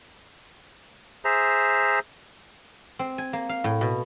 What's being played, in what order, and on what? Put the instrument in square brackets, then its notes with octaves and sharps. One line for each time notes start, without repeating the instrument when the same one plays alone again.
[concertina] G#4 C5 E5 A#5
[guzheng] C4
G#5
A#3
F5
A2
B2